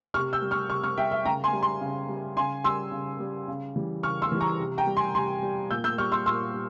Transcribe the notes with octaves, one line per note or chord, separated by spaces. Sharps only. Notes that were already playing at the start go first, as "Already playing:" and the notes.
C3 C#6 F6
E6 G6
G3
C#6 F6
C3 C#6 F6
C#6 F6
G3 E5 G5
E5
C#3 G5 A#5
G#5 C6
G3
G#5 C6
C#3
G3
C#3 G#5 C6
G3 C6 E6
C#3
G3
C#3
E3 G3
C#3 C#6 F6
C6 E6
E3 G3
A#5 C#6
C3
G5 A#5
G3
G#5 C6
C3 G#5 C6
G3
A#2 E6 G6
E6 G6
G3 C#6 F6
C6 E6
A#2 C6 E6
G3